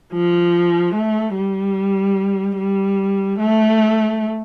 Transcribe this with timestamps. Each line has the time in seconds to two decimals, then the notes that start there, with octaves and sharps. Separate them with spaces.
0.13 F3
0.95 A3
1.35 G3
2.58 G3
3.39 A3